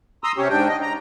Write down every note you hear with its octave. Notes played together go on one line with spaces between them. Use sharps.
A#5 C6 D#6 E6
C3 C#4 G4 C#5
G#2 D4 G5
D#5
A#5